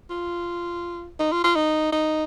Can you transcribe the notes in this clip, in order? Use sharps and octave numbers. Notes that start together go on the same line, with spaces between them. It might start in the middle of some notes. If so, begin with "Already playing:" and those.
F4
D#4
F4
F4
D#4
D#4